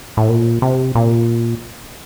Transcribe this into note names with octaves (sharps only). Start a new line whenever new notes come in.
A2
A#2
C3
A#2